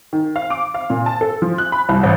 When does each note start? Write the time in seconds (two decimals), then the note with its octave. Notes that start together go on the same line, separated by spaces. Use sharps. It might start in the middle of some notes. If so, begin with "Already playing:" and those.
0.13 D#3
0.36 F5
0.50 D6
0.74 F5
0.90 A#2
1.06 A5
1.21 A4
1.42 F3
1.58 F#6
1.72 B5
1.89 C2
2.03 A1